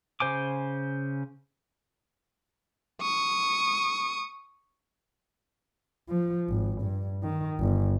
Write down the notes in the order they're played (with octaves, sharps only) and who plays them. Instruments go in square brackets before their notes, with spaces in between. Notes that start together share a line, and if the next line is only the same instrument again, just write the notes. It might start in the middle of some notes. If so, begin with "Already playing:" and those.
[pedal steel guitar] C#3 C5 G#5 D6
[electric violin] C#6 D#6
[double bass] F3
G#1
G2
D#3
G1